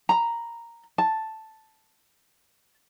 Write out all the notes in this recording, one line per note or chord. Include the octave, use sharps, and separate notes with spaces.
A#5 B5
A5